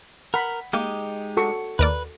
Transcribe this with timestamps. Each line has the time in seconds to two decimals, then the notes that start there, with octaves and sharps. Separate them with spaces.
0.34 A#4 F#5 B5
0.73 G#3 A#3 D#4 G4
1.37 F#4 A4 C#6
1.79 D#2 A#4 B4 D5